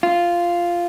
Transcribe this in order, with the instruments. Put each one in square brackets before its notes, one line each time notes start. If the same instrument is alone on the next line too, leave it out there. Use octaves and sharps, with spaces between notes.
[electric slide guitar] F4